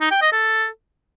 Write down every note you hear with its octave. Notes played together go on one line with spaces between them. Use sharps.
D#4
G5
D#5
A4